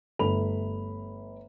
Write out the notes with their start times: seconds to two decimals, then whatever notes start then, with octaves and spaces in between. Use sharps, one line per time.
0.19 G1 A3 B5 F7